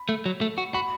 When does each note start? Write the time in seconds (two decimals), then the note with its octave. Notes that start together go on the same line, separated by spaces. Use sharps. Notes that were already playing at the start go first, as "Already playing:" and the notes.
Already playing: B5
0.09 A3
0.26 F#3
0.41 A3
0.58 F#4
0.74 F#4 B5